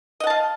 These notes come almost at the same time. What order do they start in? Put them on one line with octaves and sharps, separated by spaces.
D#5 F#5 A5 F5